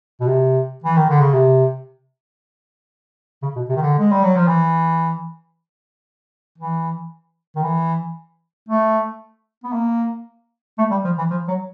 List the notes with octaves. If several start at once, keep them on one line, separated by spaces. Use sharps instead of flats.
B2
C3
E3
D#3
D3
C#3
C3
C#3
B2
C3
D#3
D3
G#3
G3
F#3
F3
E3
E3
D#3
E3
A3
B3
A#3
A3
G3
F3
E3
F3
F#3